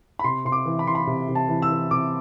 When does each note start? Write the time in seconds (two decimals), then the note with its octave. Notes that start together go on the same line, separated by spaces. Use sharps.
0.19 B5
0.24 C3 C6
0.45 C3 C6
0.52 D6
0.66 E3
0.79 B5
0.87 E3 C6
0.95 B5
1.07 C3
1.29 C3
1.35 A5
1.49 E3
1.62 E6
1.70 E3
1.91 C3 D6